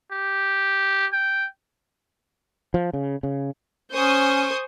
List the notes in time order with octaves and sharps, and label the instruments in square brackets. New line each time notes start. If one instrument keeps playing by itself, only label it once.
[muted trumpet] G4
G5
[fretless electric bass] F3
C#3
C#3
[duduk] C#4 [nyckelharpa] C5 [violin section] G#5 C#6 D#6